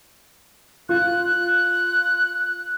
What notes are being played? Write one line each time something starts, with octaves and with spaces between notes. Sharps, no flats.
F4 F#6